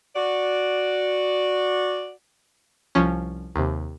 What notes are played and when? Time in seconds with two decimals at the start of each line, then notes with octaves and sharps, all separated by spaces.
0.16 F#4 D5
2.95 C2 F3 C#4
3.56 D#2 C3